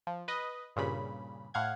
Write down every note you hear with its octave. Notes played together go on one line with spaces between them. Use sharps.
F3
B4 D#5
G2 A#2 C#3 B5
A2 F5 F#5 G#6